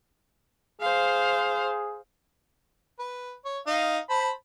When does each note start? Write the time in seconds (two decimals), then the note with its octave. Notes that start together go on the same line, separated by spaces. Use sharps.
0.81 G#4 C5 F5
2.99 B4
3.45 C#5
3.67 D#4 F5
4.10 C5 A5 B5